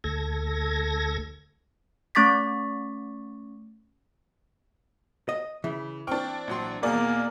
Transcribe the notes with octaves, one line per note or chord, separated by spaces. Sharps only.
D2 A4 G#6 A#6
A3 C#4 C#6 D6 A6 B6
D#5
C#3 E3
C4 D4 G5 C#6 F6
A#1 F#3 C6
E2 B2 A#3 G#4 D5 G#5